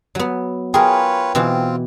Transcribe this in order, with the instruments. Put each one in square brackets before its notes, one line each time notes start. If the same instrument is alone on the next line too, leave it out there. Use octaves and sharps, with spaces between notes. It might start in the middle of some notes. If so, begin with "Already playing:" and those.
[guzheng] F#3 B3
[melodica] F4 B4 C#5 [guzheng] G#4 A#4 [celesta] G5
[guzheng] B2 E3 [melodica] C4 F4